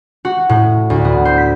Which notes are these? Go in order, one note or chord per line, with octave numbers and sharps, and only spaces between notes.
F#4
A2
D2
B3
C5
B6